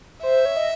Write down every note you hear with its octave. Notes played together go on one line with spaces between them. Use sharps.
C5 E5
C#5
D#5